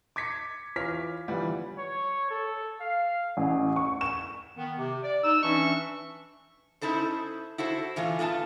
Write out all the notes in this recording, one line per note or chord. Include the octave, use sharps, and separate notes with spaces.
D6 G#6 A6 B6 C#7
E3 F4 C#5 D6 F6 B6
G1 E3 F3 G3 F#5
C#5
A4
F5
A1
C#6
E7
D#3 B3
C3
D5
D#4 E6
E3 C#4 D4 E5 C#6
C#4 D#4 E4 A4 C5
E4 F#4 A4 C5
A2 E3 A3 F4
A3 B3 F4 G#5 A5